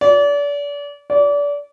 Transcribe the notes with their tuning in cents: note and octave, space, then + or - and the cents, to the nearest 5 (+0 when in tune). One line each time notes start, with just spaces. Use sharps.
D5 -35
D5 -30